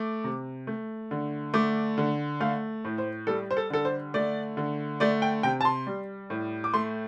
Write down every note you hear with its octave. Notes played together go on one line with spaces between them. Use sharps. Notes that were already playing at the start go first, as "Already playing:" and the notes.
Already playing: A3 D6
C3
A3
D3
A3 D6
D3
A3 F5
A2
C5
G3 A4
C5
A4
D3 A4
C5
A3 D5
D3
A3 D5
G5
C3 G5
A5
C6
G3
A2
D6
A3 C6